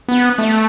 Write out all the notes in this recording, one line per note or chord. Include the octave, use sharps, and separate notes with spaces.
B3
A3